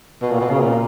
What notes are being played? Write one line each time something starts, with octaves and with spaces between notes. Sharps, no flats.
B2
A#2
B2
C#3
A#2